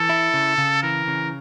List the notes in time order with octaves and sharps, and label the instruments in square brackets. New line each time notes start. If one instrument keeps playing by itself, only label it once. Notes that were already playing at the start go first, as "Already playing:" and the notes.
Already playing: [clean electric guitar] E3 [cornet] A4
[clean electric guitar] E4
C#3
C#3
[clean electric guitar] E3 [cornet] A#4
[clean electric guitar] C#3